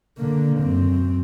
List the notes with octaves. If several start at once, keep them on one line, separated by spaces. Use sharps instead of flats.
D3 A#3
F#2 C4